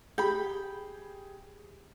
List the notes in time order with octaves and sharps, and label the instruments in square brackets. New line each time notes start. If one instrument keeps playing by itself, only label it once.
[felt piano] G4 G#4 [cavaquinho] G5 B5